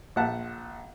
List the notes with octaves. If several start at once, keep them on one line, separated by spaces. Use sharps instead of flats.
A#1 E5 F#5 A5